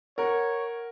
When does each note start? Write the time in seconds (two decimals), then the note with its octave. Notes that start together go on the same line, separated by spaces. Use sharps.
0.18 A#4 C#5 F#5